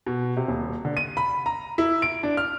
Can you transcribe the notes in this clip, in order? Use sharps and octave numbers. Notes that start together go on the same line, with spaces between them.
B2
C3
D#1
D3
D#7
B5
A#5
E4
D7
D4
F6